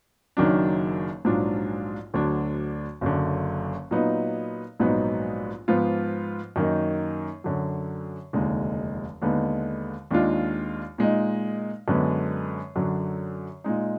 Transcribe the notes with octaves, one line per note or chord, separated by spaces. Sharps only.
F#1 F#2 D#3 F#3 D4
A#1 G#2 F#3 D4 F4
D2 D3 F#3 D4
F#1 F#2 D3
A#2 F#3 B3 D#4
A#1 G#2 F#3 B3 D#4
G#2 F3 B3 F4
F#2 D#3 A#3 D#4
F#2 D3 F#3
F1 D#2 D3 G#3 D#4
D#2 D3 G#3 B3 D#4
D#2 D#3 G#3 D4 F4
A#2 G#3 D#4
F#2 D3 G#3 B3
F#2 D3 F#3
A#2 G#3 D#4